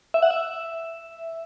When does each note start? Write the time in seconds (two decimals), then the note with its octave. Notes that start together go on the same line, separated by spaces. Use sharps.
0.14 E5
0.22 F#5
0.31 E5